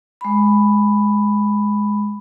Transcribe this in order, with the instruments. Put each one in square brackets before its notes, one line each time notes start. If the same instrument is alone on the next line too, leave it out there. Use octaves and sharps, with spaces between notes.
[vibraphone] G#3 B5